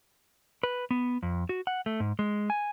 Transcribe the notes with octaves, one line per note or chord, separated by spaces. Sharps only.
B4
B3
F2
F#4
F#5
A3
G#2
G#3
G#5